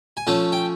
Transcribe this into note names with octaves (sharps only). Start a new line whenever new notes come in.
G#5
F3 A3 C#4 A5
G5